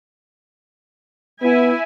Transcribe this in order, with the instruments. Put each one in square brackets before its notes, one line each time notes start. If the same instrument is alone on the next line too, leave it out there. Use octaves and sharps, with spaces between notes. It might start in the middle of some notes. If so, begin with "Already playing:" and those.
[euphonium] B3 [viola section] E4 E5 G#5